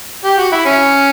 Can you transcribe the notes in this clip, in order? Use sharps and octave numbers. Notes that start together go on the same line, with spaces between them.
G4
F#4
E4
C#4